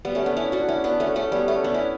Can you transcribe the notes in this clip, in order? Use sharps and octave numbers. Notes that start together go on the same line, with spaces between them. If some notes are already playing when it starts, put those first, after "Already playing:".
G3 B3
A3 C#4
B3 D4
C#4 E4
D4 F#4
C#4 E4
B3 D4
A3 C#4
A3 C#4
G3 B3
A3 C#4
B3 D4
C#4 E4